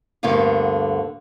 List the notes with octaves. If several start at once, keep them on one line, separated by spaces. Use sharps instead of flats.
D2 G2 D3 A#3 B3 F5